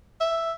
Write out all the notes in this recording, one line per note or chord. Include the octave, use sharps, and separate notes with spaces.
E5